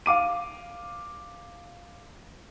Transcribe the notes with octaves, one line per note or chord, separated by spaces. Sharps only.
F5 D6 D#7